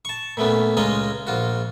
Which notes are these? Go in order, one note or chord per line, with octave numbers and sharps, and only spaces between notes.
A5 C#6
A#2 A3 B3 C#4
C#2 G#3 C#4 F4 D#5 A#5
A#1 F4 F#4